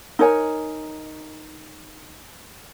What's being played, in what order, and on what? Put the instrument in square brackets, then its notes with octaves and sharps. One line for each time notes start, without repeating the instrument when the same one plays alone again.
[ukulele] D#4 A#4 C#5 G#5